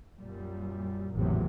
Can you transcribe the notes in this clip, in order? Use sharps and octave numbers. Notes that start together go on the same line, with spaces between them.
F#2 A#2 G3
G#1 E2 A2 C3 F#3